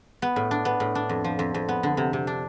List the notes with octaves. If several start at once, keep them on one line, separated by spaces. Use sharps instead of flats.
B3
A2
D4
B3
A2
D4
F2
F3
F2
F2
B3
D3
C3
C3
D4